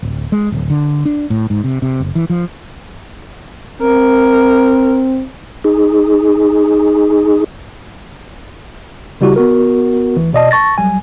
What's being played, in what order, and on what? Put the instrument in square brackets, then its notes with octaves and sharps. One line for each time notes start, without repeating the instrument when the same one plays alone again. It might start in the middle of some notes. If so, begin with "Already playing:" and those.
[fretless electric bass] D1
G#3
D1
D3
D4
A2
G#2
C3
C3
F#1
E3
F3
[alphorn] C4 [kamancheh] A#4
[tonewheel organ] D#4 G#4
[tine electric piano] C#3 G3 E4 F#4 G4
B3 F#4 A#4
D2 E3
B2 D5 D#5 A5
A5 C#6 A6 A#6
B1 F#3 G3 G#5